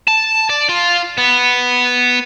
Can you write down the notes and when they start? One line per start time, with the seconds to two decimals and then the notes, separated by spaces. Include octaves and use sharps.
0.08 A5
0.50 D5
0.69 F4
1.18 B3